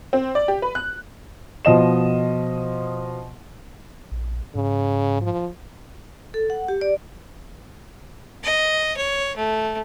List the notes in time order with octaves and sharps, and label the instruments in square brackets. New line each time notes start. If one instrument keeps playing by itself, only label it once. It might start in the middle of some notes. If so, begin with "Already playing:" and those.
[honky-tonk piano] C4
D5
G4
B4
F#6
[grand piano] B2 F3 D#5 E7
[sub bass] A#1
[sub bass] G#2 [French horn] C#3
[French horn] F3
[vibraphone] A4
F#5
G4
D5
[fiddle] D#5
C#5
A3